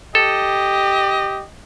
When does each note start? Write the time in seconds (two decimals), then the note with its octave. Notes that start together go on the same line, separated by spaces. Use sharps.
0.15 G4 A4 D#5